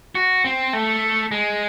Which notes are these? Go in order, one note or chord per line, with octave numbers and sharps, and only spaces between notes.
F#4
C4
A3
G#3